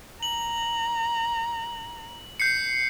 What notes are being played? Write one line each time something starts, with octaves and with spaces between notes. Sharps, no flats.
A#5 F#7
G6 C7 C#7